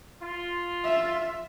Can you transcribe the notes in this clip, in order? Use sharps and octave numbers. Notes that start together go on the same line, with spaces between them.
F4
E5